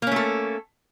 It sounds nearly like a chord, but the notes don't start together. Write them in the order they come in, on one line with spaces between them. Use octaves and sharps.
A#3 C#4 A3 A4